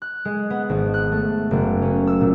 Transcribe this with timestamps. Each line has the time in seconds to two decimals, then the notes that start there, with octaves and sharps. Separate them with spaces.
0.02 F#6
0.25 G#3
0.50 B3
0.69 G#1
0.94 F#6
1.12 A3
1.51 F#1
1.82 C#4
2.07 E6
2.21 A#2